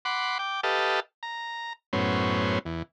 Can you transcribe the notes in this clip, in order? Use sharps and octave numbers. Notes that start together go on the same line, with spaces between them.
F#5 B5 C6 D6
G5 D6
G4 A4 B4 D#5 F5 A5
A#5
F#2 A2 B3 C#4 C5
E2